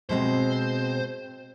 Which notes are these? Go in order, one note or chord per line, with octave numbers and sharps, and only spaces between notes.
B2 G#3 C4 C5